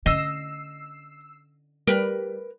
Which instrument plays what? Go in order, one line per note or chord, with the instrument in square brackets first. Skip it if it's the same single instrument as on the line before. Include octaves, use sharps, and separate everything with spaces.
[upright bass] D3 C#4 [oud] D#5 [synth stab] E6 C7
[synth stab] G3 [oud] A#4 B4